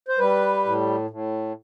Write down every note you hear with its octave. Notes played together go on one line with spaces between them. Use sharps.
C5
G3 B4
A2
A2